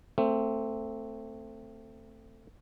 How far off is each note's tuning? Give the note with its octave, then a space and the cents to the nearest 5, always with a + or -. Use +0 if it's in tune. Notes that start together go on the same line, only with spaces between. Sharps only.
A3 +20 C4 +0